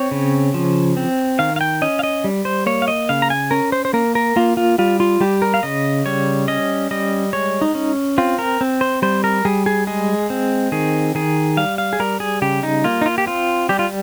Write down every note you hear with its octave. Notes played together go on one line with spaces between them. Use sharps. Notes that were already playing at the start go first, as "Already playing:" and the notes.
Already playing: C4 C#5
C#3
F3
C4
D#3 F5
F5
G5
C#4 D#5
F5
D#5
G3
C5
A#3 C#5
F5
D#5
C#3 F5
A#5
G#5
C#4 A#4
C5
C5
A#3 A#4
A#4
A#3 F4
F4
G3 F4
F4
G3 G4
A#4
F5
C#3 D#5
G3 C#5
C#4 D#5
G3 D#5
G#3 C#5
D#4
C#4
C4 F4
A#4
C4
C5
G3 C5
A#4
G3 G#4
G#4
G#3 G#4
C4
D#3 G#4
D#3 G#4
G3 F5
F5
G#4
G3 A#4
G#4
C#3 G4
D#4
A#3 F4
D#4
F4
G4
C4 F4
G3 G4
F4